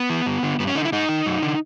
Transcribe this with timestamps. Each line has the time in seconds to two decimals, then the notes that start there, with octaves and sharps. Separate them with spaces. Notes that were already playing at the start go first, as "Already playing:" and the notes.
Already playing: B3
0.10 E3
0.26 G2
0.43 D3
0.59 G2 B3
0.67 C#4
0.75 D3 D#4
0.85 E4
0.92 G#2 D#4
1.09 D#3
1.26 F#2
1.42 D3